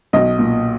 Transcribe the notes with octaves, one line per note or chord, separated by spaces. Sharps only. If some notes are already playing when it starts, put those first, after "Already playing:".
B1 D#5
A#2